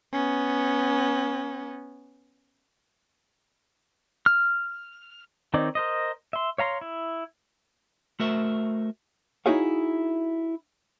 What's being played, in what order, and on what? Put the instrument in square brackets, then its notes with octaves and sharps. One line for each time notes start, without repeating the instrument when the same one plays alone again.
[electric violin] B3 C#4
[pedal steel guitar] F6
D#3 C4 D#4 C#5 D5
A#4 C5 D#5
E5 C6
C#5 F5 A#5 C6
E4
[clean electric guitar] A3 F#4 A#4 C5 E5
[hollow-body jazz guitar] D#4 E4 F#4 G#4 C#5 F5